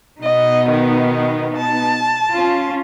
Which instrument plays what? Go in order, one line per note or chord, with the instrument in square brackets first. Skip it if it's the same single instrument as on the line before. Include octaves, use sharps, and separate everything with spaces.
[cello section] B2 B3 D#4 [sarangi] D#5
[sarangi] D#3
A5
[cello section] C#4 F4